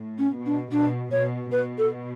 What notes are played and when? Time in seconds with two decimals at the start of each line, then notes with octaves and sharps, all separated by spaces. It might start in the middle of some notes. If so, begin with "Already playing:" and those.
Already playing: A2
0.18 C#4
0.33 B2
0.46 D4
0.72 B2 D4
1.12 B2 C#5
1.51 B2 B4
1.78 A4